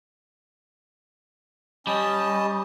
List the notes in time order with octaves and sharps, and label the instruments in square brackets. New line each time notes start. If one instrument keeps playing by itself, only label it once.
[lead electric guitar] G3 [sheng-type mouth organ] C#4 D#5 A5